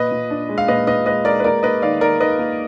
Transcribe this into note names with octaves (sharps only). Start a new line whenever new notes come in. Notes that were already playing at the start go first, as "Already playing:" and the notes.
Already playing: A#2 B4 D#5
A#2
D4
G#3
F5
A#2 B4 D#5
A#2 B4 D#5
G#3 B4 D#5
G#3 A#4 D5
B4
A#3 A#4 D5
A#3 B4 D#5
D#3 D5 F5
D#3 A#4 D5
D#3 B4 D#5
A#3